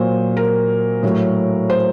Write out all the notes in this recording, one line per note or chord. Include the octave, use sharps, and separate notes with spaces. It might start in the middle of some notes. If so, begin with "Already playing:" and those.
Already playing: A#2 F#3 C5
A#4
A2 F#3
C5